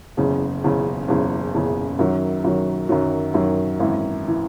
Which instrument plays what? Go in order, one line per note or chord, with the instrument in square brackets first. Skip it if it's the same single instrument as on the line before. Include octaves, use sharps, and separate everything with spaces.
[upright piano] F#1 E2 C#3
F#1 E2 C#3
F#1 E2 C#3
F#1 E2 C#3
F#2 D#3 F#3
F#2 D#3 F#3
F#2 D#3 F#3
F#2 D#3 F#3
G#1 F#2 E3
E3